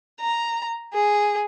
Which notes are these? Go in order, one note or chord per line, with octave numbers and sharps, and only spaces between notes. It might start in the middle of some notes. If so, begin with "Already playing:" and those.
A#5
G#4